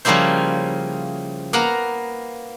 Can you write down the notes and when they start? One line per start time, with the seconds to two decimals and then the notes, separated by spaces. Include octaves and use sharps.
0.05 C#3 F3 G3 A#3 E4 C5
1.53 A#3 B3 A#4 F#5 A#5